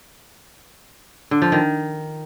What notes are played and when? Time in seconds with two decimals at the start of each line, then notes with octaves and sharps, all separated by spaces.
1.31 D3
1.42 F3
1.52 D#3